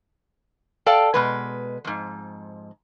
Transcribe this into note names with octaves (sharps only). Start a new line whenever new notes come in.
A4 D5 F5 G5 A5
B2 G#3 B4
F2 G#2